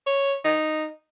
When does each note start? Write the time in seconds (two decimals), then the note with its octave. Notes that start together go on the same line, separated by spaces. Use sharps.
0.06 C#5
0.44 D#4